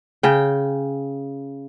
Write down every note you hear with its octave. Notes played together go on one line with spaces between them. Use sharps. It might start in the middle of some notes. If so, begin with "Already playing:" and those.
C#3 G5